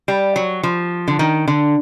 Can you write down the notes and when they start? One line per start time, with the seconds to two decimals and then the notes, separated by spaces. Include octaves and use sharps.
0.08 G3
0.36 F#3
0.63 F3
1.08 D3
1.19 D#3
1.48 D3